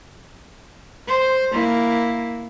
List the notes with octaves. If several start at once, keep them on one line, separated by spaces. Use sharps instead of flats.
C5
A#3 E4